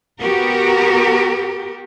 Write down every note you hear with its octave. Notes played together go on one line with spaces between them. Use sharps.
B3 F#4 G4 A#4